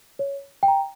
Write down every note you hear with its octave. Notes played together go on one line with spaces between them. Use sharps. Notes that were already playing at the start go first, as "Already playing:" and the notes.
C#5
G5
A#5